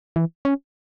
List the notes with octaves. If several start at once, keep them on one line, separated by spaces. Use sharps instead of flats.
E3
C#4